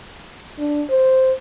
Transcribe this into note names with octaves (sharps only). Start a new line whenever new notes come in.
D4
C5